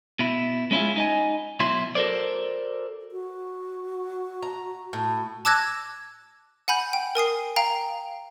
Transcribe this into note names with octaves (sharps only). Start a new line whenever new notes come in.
B2 E4
G#3 C#4 E4 F4 G#4
D#4 D#5 G#5
B1 B2 F#3 E4 C6
F#4 A4 A#4 C5 D5
F#4
A#5
A2
A5 D6 E6 F#6 G#6 A#6
F#5 G#5 B5 G6
G5
A#4 G#5 D#6 C7
F5 G5 A#5